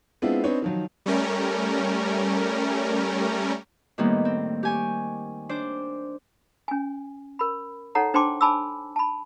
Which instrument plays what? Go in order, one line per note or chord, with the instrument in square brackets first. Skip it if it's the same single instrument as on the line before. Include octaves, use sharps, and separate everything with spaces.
[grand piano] G#3 B3 C4 D4 E4 F4
C4 D4 D#4 B4 C#5
D#3 F3 F#3
[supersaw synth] G3 A3 C#4 A#4
[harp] A2 D#3 G3 A#3 B3
C4
G4 G#5 C#6
D4 C5 D6
[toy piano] C#4 G#5
A#4 B5
D#4 A4 C#5 F#5 A#5
D4 C5 G5 A5 C6 D6
G#5 A5 B5 D6 E6
A5 B5